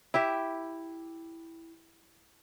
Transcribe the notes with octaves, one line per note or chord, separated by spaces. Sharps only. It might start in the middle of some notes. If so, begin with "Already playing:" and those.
E4 G4 E5